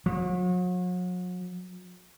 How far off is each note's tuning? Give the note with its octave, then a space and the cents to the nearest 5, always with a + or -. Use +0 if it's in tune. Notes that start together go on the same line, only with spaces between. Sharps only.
F#3 -40